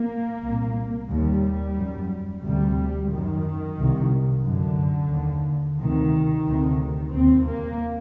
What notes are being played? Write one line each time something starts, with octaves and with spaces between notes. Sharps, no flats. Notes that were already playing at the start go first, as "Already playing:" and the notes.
Already playing: A#3
C2 A#2
D#2 G3
F#2
D2 C3 G3
F#2 D#3
C2 C3
F#2 D3
D#2
D2 C3 D#3
D2 C3
D#2 C4
A#3